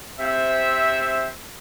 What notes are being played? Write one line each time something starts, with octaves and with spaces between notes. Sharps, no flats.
C3 C4 C5 E5